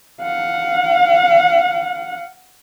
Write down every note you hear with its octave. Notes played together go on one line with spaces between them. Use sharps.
F5 F#5